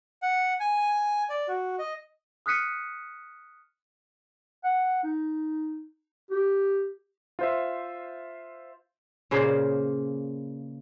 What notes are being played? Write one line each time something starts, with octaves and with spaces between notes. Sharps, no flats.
F#5
G#5
D5
F#4
D#5
D#6 F6 F#6 B6 C#7 D#7
F#5
D#4
G4
F4 C5 E5
A#2 C#3 A#3 C5